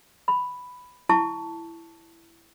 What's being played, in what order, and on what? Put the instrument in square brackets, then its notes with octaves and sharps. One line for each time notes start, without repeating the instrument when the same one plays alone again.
[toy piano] B5
E4 A5 C#6